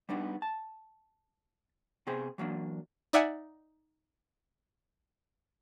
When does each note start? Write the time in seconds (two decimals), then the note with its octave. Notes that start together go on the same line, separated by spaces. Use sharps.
0.09 G3 B3 D4 D#4
0.42 A5
2.07 C3 B3 G#4 C5
2.38 E3 F#3 A#3 D4
3.13 D#4 D5 E5 F#5 G#5